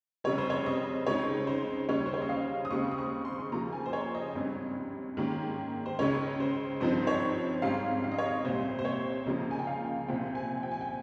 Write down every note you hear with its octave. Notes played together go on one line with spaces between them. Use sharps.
F1 F2 C#3 G3 C#5
C5
C#5
D#5
C#2 C#3 G#3 C4 D#4 C#5
C5
D#2 C#3 G3 C#4 C#5
C5
C#5
D#5
F5
D#6
D#2 C#3 G#3 C4 C#6
D#6
C#6
C6
C#6
C6
D#2 C#3 F3 A#3 A#5
G#5
C5
C#5
D#5
G#1 G2 G3 C#4
G#2 D#3 A#3 C#4
C5
C#2 C#3 G#3 C#4 C#5
C5
G#1 G2 F3 C4 D#4 C5
C5
C#5
G#1 G#2 G3 C#4 F5
F5
D#5
C#5
D#5
C2 A#2 G3 C5
C5
C#5
C#2 C#3 F3 A#3 D#5
G#5
G5
F5
C2 A#2 F3 C4 G5
G#5
G5
G#5
G5